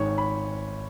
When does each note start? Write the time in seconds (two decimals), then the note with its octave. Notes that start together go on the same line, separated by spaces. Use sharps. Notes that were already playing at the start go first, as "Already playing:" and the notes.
Already playing: G#1 G#2 G#3 C#5
0.18 B5